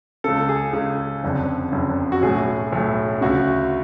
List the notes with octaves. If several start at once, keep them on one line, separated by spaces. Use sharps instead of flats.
C#2 C#3 A4
G#4
C#2 C#3 G#4
F#1 F2 D3
F#1 F2 D3
F#4
B1 A2 G#4
B1 A2
D2 C#3 F#4